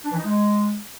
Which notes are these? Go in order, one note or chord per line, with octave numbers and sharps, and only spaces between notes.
D4
E3
D#4
G#3